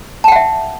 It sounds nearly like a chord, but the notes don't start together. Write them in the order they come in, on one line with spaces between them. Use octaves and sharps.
A5 G5 F#5 E5